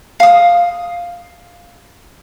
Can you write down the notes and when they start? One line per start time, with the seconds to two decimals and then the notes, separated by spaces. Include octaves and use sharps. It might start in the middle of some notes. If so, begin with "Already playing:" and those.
0.20 F5 D#6